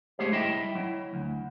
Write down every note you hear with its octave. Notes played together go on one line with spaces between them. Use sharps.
G#3 A3 G4 G#4 C5
G3 E4 D#5 E5 G5
F#3 E4
D2